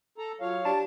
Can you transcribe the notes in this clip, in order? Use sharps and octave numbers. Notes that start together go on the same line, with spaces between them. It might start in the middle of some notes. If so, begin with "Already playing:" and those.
A4 A#5
F#3 F4 C#5 F5
D4 G4 A5